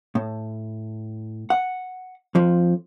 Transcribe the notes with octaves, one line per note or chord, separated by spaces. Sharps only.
A2
F#5
F2 F3